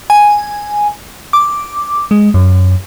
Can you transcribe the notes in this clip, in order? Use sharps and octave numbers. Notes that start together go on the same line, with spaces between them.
G#5
D6
G#3
F#2